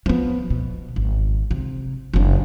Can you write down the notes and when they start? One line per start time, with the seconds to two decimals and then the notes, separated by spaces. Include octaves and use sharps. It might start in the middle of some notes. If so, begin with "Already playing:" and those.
0.06 F3 B3
0.50 B2
0.96 G#1
1.51 C3
2.14 F#1 D4